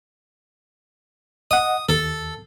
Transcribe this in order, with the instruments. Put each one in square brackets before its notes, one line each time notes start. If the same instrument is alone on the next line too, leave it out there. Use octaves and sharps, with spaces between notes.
[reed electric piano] D#5 F#5 [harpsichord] D#6
[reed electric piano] D#2 [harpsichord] A4